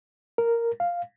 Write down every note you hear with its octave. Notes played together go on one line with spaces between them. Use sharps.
A#4
F5